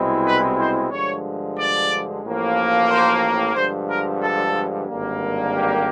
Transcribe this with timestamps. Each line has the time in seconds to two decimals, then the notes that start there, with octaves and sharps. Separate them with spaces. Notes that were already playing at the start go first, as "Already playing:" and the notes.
Already playing: C2 B2 G#3 C4 E4
0.25 B4
0.59 C5
0.92 G2 D3 F3 G#3 C#5
1.57 D5
2.24 A1 A2 F3 A#3
2.90 C5
3.55 G2 D3 F3 G#3 C5
3.89 A#4
4.21 A4
4.88 G#1 G2 D3 G3 A#3
5.54 G4